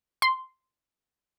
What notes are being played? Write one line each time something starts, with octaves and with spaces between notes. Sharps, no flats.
C6